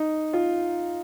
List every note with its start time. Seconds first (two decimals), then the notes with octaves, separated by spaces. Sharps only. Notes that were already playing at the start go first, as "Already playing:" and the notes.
Already playing: D#4
0.33 F4